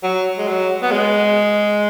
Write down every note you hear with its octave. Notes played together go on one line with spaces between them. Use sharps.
F#3
G#3
F#3
B3
G#3